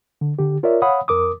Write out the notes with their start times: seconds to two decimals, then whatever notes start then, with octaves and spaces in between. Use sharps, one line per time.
0.21 D3
0.39 D3 G4
0.63 F4 A#4 C#5 D5 E5
0.82 C#5 F5 F#5 B5 D#6
1.08 F2 A#4 D6 D#6